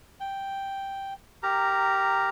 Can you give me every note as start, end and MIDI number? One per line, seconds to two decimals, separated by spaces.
0.20 1.14 79
1.43 2.30 67
1.43 2.30 70
1.43 2.30 82